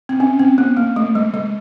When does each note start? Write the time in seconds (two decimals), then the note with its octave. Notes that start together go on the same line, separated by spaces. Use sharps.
0.09 C4
0.20 C#4
0.39 C4
0.58 B3
0.77 A#3
0.96 A3
1.15 G#3
1.34 G#3